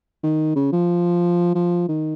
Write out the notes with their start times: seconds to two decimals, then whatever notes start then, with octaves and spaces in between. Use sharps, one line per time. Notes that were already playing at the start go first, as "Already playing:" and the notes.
0.23 D#3
0.56 C#3
0.73 F3
1.55 F3
1.89 D#3